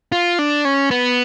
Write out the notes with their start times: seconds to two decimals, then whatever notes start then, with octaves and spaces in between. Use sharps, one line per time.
0.12 F4
0.39 D4
0.65 C#4
0.91 B3